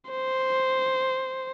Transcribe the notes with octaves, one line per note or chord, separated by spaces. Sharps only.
C5